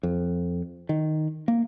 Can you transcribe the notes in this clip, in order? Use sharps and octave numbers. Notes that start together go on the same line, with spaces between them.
F2
D#3
A#3